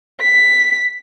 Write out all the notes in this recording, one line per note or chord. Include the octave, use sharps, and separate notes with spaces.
B6